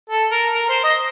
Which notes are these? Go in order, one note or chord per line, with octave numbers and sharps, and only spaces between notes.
A4
A#4
A#4
C5
D#5